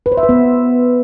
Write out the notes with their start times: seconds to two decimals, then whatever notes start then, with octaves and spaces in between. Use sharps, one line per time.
0.06 B4
0.12 C5
0.17 E5
0.23 B4
0.29 B3